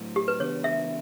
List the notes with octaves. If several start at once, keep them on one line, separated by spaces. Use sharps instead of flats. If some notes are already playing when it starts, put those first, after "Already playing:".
Already playing: A2 F#3 A3
G4
B4
C#3 E3 B3 D4 C#5
E5